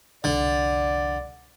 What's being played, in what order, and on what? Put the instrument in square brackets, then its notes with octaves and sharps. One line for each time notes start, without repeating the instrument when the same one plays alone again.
[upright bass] C2 F2 [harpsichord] D3 [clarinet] D5